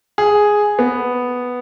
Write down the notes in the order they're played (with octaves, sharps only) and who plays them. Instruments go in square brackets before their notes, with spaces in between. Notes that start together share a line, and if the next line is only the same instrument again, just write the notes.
[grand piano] G#4
B3